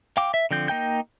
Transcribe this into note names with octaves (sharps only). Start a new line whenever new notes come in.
F5 G5 D6
E5
D3 F3 C4 G6
A#3 D#4 G5 G6